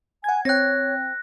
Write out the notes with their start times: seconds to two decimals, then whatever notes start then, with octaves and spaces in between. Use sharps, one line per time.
0.24 F#5 G#5 G#6
0.45 C4 C#5 G5 F#6 A#6